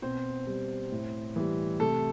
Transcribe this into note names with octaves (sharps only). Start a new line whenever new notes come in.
B2 C4 C5
G3
A2
E3 G3
C3 A3 A4